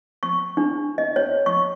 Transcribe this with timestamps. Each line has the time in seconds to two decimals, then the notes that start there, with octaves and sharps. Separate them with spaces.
0.23 C#6
0.57 D4
0.98 D#5
1.16 C#5
1.46 C#6